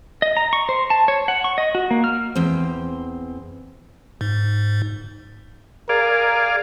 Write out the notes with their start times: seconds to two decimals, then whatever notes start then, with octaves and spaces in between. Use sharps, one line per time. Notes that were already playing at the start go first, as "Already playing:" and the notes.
0.22 D#5
0.37 A#5
0.53 C#6
0.69 C5
0.90 A5
1.08 C#5
1.28 F#5
1.44 C#6
1.58 D#5
1.75 F#4
1.91 A#3
2.04 F6
2.35 E2 C4
4.21 G#2
5.89 G#4 A#4 D5 F5